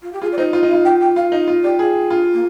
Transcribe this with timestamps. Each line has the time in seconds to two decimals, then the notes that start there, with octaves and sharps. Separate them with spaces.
0.02 F4
0.13 G4
0.22 F4 G#4
0.32 D5
0.37 D#4 C5
0.53 F4 D#5
0.63 D#4
0.69 F5
0.73 F4
0.85 G5
1.01 G5
1.16 F4 F5
1.32 D#4 D#5
1.48 F4
1.63 G4 D5
1.79 F4 G#4
2.10 D4 F4
2.33 A#3